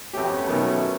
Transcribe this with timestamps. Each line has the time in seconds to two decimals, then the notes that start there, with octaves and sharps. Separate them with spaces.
0.13 F2 A3 B3 C#4 G4
0.47 B2 D#3 F#3